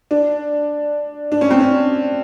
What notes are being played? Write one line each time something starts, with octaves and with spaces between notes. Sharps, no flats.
D4
D4
C#4
C4
C#4